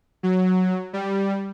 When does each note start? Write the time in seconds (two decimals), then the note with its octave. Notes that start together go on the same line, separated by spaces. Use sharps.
0.23 F#3
0.93 G3